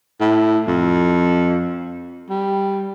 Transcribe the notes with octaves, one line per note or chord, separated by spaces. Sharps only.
A2
F2
G3